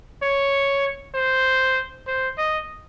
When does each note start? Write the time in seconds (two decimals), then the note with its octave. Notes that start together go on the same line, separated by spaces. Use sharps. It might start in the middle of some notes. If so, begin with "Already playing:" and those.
0.22 C#5
1.14 C5
2.07 C5
2.38 D#5